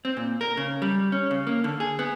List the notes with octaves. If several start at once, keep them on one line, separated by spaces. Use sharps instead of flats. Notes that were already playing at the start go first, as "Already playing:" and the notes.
C4
A#2
A#4
C#3
G3
C#4
C#3
A#3
D3
G#4
B3